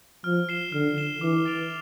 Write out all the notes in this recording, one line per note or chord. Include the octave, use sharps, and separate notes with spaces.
F3 F6
C7 E7 G7
D3 F6
C7 E7 G7
E3 D6
A6 D7 F7